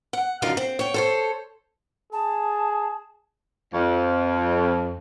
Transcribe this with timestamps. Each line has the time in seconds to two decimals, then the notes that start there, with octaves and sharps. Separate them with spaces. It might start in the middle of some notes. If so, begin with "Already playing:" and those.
0.13 F#5
0.42 F#2 D3 D#4 F4 A#4 F5
0.57 C4
0.79 C#5 G5
0.94 A4 C5 C#5
2.13 G#4 A5
3.74 F2